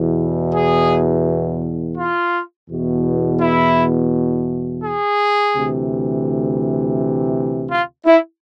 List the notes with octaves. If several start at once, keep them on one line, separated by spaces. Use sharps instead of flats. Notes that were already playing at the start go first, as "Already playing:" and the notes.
Already playing: E2 B2
G#4
F4
E2 B2
E4
G#4
D2 C3 E3
F4
E4